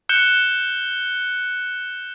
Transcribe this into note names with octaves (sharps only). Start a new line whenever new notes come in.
F#6 G6 C#7 E7 G7